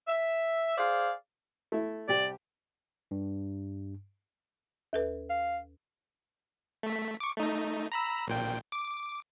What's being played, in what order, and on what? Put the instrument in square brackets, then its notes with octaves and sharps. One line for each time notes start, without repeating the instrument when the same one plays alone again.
[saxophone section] E5
G#4 C5 D5 F5
[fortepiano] A3 E4
[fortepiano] C2 G4 [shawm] D5
[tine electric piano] G2
[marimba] D#2 A4 B4
[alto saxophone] F5
[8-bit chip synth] A3 B6
C#6 D6
A3 D#4
A#5 B5 E6
A#1 A#2 G5
D6